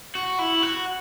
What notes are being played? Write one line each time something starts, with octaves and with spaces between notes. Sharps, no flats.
F#4
E4
F#4